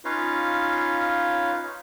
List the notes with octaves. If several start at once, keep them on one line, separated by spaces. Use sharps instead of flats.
C#4 D#4 F4 B4 C#5 F5